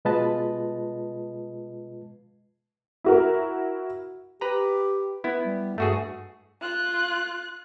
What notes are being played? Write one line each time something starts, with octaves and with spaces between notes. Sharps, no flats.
B2 G#3 F4 B4 D#5 A5
E4 F#4 A#4
G4 B4 A#5
B3 E4
G3
G2 A3 F#4 G#4
F4 F#6